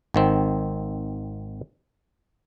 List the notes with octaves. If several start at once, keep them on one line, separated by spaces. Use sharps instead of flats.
G#1 D#3 C4